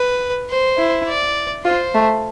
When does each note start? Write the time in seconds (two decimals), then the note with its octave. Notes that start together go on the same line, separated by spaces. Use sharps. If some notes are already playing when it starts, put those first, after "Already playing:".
Already playing: B4
0.50 C5
0.78 E4
1.08 D5
1.65 F4 C5
1.94 A3